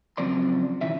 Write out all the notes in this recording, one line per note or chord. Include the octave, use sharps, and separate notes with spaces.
C#3 F3 F#3 C4 D5 C6
B2 D#3 E3 C#4 E5